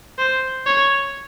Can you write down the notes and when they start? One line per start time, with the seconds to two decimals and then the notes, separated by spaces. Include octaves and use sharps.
0.18 C5
0.66 C#5